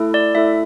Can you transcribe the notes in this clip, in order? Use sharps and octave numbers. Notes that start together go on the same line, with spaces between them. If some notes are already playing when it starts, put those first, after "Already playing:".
Already playing: A3 E4 A4
D5
A3 E4 A4 E5